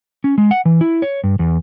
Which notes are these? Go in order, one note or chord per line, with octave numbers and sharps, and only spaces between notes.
C#4
G#3
F#5
E3
E4
C#5
G2
E2